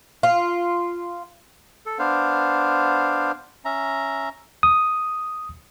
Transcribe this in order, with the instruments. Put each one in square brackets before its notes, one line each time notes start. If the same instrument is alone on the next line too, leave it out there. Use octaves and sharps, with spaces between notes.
[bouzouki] F4
[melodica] A4
B3 D4 C5 F5
C#4 E5 A#5
[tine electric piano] D#6